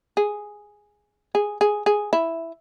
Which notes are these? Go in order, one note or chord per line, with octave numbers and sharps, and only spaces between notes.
G#4
G#4
G#4
G#4
E4